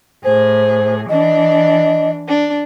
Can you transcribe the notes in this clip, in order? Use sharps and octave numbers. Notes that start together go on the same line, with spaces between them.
A2 G#4 C5
E3 D4 D#5
D4